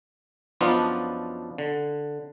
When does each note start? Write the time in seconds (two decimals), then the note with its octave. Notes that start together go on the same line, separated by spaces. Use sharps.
0.61 F#2 F3 B3 D4 D#4 F4
1.58 D3